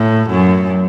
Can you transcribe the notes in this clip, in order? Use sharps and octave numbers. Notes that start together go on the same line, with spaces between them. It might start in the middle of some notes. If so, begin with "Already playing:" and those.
Already playing: A2
F#2